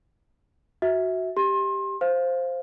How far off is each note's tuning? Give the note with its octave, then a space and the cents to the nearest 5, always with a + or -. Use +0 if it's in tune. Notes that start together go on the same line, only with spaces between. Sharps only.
F#4 +0 E5 -20
G4 +0 C6 +30
C5 +0 F5 +0